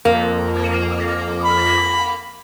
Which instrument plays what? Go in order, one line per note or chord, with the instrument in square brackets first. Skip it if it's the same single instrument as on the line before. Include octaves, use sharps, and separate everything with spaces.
[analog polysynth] F2 [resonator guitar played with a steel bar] A#3
[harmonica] B5